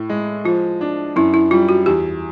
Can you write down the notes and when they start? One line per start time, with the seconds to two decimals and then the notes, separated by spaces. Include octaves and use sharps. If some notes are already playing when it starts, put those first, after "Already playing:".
Already playing: A2
0.09 G#3
0.45 F3 F4
0.81 D4
1.16 F#2 E4
1.34 E4
1.51 G3 F4
1.69 F#4
1.86 E2 G4